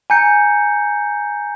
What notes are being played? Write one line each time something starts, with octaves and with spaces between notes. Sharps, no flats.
G#5 A#5 G6 C#7